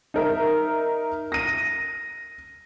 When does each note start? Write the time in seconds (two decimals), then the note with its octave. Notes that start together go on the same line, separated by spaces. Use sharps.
0.14 D#4 A#4 E5
1.32 A#6 D#7